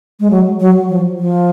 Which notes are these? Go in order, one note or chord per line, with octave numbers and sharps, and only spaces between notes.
G#3
F#3
F#3
F3
F3